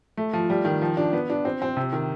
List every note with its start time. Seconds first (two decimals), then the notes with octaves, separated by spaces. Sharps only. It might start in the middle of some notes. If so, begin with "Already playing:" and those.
0.17 A3
0.33 F3
0.50 G3
0.65 D#3
0.82 F3
0.97 D4
1.13 B3
1.30 D4
1.45 C4
1.62 C4
1.77 C3
1.93 D#3